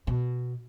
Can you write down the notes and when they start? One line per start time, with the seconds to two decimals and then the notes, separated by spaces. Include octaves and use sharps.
0.07 B2